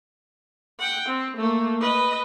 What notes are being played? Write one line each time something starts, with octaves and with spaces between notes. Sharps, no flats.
F#5 G5
C4
A3 A#3
B4 D#5